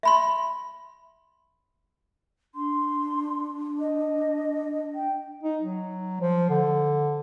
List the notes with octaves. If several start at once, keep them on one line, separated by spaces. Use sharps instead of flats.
E5 B5 C6
D4 C6
D#5
G5
D#4
F#3
F3
D3